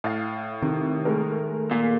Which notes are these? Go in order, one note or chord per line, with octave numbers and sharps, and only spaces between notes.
A2 F5 A6
C3 D#3
G#3 A3 A#4
A#2